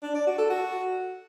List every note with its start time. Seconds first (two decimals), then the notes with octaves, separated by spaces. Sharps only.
0.03 D4
0.15 D5
0.26 F#4
0.38 A4
0.50 F#4